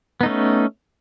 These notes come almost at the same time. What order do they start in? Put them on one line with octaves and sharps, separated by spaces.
B3 D#4 A3 C#4